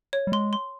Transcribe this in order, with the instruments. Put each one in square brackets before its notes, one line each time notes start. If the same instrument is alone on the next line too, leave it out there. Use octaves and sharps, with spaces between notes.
[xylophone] C#5
[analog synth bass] G3
[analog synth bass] G#3 [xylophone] C6
[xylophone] C6